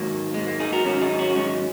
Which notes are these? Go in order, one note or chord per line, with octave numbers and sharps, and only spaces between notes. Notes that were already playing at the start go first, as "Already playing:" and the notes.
Already playing: G#2 D#3 F#3 A#3
G#3
A#3
D#4 G#4
F#4 A#4
G#2 D#3 F#3 C#4 F#4
D#4 G#4
C#4 F#4
G#3 C#4